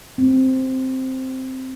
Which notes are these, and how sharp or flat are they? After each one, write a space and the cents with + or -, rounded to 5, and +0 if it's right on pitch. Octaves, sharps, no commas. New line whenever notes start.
C4 +0